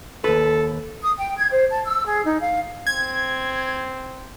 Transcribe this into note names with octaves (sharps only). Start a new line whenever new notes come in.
D#2 A4 B4
D#6
G5
G#6
C5
A5
E6
G#4
D#4
F5
C4 G#6